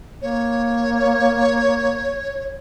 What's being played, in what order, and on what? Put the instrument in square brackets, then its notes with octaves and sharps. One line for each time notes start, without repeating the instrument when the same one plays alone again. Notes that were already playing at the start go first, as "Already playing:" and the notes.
[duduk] A#3 [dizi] C#5